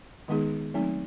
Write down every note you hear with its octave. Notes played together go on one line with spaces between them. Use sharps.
D#3 G#3 B3 D#4 G#4
F#3 A3 C4 D#4